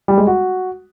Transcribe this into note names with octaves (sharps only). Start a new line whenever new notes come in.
G3
G#3
F#4